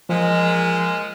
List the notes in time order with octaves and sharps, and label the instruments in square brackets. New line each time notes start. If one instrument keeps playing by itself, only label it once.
[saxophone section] A#2 G#3 [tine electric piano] F3